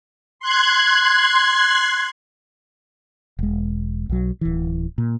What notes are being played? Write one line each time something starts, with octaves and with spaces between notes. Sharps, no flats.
C6 F#6 G#6
E1 G#3
B1 F#3
D1 E3
A#2